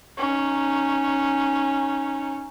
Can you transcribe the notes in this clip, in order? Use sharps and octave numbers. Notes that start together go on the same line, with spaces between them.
C#4 D#4